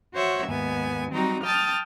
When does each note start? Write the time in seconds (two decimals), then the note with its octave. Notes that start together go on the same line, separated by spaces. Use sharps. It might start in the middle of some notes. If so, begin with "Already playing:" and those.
0.15 F#4 C5 C#5 E5 F#5
0.47 D#2 G#2 B3 G#5
1.13 F#3 G3 C4 D#4 F#4 A#5
1.44 G5 A5 D#6 F6 A6